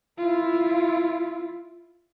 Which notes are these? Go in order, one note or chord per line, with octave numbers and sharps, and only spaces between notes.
E4 F4